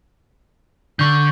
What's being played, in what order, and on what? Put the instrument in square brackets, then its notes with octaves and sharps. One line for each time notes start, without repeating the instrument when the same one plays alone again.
[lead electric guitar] D3 [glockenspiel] C#6 G6